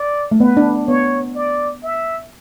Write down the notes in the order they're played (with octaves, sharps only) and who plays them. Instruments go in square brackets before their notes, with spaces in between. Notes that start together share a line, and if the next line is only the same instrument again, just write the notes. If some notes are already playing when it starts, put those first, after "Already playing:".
Already playing: [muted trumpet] D5
[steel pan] A3
[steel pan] B3 [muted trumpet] B4
[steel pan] D4
[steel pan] B3 [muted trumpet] C#5
[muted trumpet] D5
E5